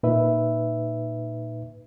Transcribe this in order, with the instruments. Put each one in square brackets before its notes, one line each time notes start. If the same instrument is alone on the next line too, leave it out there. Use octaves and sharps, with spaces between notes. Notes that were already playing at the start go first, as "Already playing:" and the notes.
[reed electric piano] A#2 D#4 B4 E5